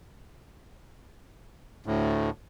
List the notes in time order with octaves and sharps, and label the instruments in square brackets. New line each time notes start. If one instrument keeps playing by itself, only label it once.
[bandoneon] D2 A2